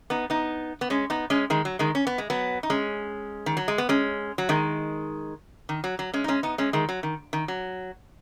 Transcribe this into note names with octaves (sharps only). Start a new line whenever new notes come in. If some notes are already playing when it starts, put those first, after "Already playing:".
B3 D#4
B3 D#4
B3
G#3 C#4
B3 D#4
G#3 C#4
D#3 G#3
F#3
D#3 G#3
C#4
B3
G#3
F#3 B3
D#4
G#3 C#4
D#3
F#3
G#3
B3
G#3 C#4
F#3
D#3 G#3
D#3
F#3
F#3
G#3 C#4
D#4
G#3 C#4
B3 D#4
G#3 C#4
D#3 G#3
F#3
D#3
D#3
F#3